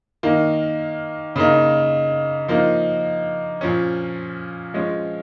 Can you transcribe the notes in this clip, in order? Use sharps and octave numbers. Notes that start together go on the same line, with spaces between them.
D#3 A#3 D#4
C#3 A#3 D#4
F3 A#3 D#4
A#2 F3 C#4
F3 G#3 C#4